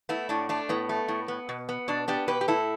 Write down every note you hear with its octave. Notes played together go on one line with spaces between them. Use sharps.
A3 B3 E4
A2 D4
A3 D4
A2 B3
A3
A2
B3
B2
B3
B2 D4
B3 D4 G4
B2 G4 B4
G4
A2 E4 A4